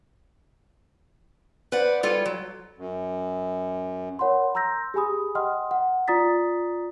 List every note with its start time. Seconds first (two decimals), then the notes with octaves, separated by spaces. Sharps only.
1.72 B4 C5 D5 F#5
2.03 G3 F4 A4 C#5
2.25 F#3
2.78 F#2
4.19 A#4 C#5 F#5 B5 C6
4.55 A#5 C6 E6 G6 A#6
4.94 G4 G#4 G#5 B5 D#6
5.35 D#5 F#5 G5 C6 D#6 F6
5.71 F#5
6.08 F4 D5 A#5 D#6 A6 B6